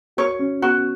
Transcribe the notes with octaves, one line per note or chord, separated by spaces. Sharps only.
F#4 C#5
C#4
B3 F#4